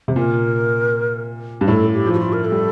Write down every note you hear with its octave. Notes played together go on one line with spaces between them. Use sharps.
C3
A#2 A#4
G2
A2 A4
G4
F3
G4
F4
A#4
A4
G3